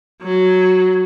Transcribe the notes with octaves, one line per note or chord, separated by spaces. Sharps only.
F#3